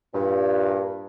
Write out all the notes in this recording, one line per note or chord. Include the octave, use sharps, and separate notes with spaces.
G2 A#2